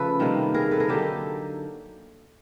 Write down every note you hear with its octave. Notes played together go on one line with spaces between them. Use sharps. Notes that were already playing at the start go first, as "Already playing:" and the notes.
Already playing: C#3 F3 A3 A4 B4
C3 D#3 G3 A#3
G#4 A#4
A4 B4
G#4 A#4
D3 F#3 A#3 D#4 G4 A4